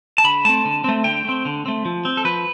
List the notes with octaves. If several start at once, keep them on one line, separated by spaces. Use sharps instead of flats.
A5
D3 B5
A3 C4 A5
D3
A3 C4
D3 G5
A3 C4
D3
A3 C4
F3
C4
A4
F3 B4